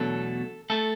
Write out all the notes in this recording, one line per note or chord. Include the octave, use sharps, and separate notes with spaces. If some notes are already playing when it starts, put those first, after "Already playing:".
Already playing: E2 B2 F#3 A3 D4 A4
A3 A4